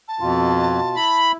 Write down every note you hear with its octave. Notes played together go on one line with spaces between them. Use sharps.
A5
F2 B2 F4
E4 B5